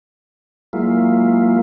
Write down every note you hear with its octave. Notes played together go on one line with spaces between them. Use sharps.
F#3 G#3 A#3 E4 F4